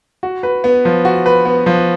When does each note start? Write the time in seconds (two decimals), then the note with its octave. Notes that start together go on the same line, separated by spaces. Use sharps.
0.23 F#4
0.43 B4
0.64 B3
0.85 F3
1.05 F#4
1.26 B4
1.45 B3
1.66 F3